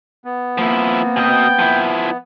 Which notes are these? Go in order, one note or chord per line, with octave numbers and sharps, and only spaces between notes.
B3
F3 A#3 C4 E4
B2 D#5 G5
F3 E4